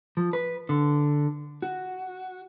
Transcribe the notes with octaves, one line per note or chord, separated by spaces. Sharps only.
F3
B4
D3
F#4